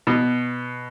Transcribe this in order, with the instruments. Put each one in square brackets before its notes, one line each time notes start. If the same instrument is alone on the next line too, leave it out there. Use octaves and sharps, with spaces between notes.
[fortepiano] B2